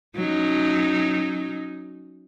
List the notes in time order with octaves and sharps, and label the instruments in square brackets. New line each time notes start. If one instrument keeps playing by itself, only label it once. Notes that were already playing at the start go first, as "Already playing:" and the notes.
[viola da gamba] F#3 C#4 D#4